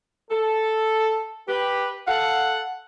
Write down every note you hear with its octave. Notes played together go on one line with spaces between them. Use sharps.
A4
G4 B4
A4 F5 F#5